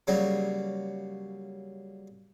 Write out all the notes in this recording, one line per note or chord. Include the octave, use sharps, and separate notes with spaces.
C#3 F#3 G3 A#3